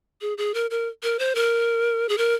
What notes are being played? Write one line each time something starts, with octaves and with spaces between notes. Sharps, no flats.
G#4
G#4
A#4
A#4
A#4
C5
A#4
G#4
A#4